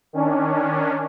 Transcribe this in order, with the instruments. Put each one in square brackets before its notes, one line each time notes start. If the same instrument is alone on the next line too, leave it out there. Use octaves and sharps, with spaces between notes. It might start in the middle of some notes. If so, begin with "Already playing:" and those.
[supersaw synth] D#3 C#4 D4